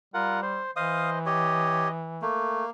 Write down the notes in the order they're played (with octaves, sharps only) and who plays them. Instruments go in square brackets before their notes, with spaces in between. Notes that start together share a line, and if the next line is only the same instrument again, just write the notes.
[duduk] G3 [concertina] F4 A#4 F#5
[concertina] C5
[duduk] E3 [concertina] C5 D#5 [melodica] F5 D#6
[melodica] G4 C#5 [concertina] D#5
[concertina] A3 [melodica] A#3